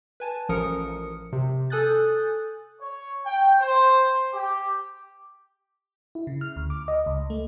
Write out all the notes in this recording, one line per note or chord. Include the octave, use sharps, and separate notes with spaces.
B4 G#5 A5
A1 F3 A#4 D#6 C#7
C3
A4 G#5 D#6 F#6 G6 A6
C#5
G5
C5
G4
E4
C#3
F6
D2
D6
D#5
C#2
A3